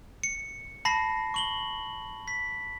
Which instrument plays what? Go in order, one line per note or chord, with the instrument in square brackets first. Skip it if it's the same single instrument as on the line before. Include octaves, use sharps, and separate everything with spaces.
[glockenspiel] C#7
A5 B5 A#6 C7
C#6 F#7 G7
B6